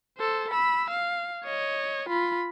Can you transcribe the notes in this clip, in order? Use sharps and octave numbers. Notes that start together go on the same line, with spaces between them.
A4 C5
B5 E6
F5
C#5 D#5
F4 B5